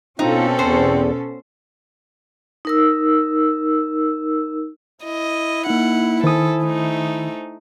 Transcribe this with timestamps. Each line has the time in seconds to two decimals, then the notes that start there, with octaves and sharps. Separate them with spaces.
0.19 B2 C4 C#4 D#4 F4 A4
0.59 E2 C5
2.65 D#4 A#4 E6
5.05 E4 D#5
5.67 A#3 D#4 F#5
6.24 D#3 A4 C5 G#5 D#6
6.63 A3 D#4